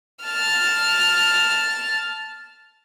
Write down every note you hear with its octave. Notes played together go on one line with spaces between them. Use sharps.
A5 F6